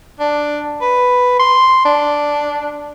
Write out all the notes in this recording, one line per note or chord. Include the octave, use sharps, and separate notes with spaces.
D4
B4
C6
D4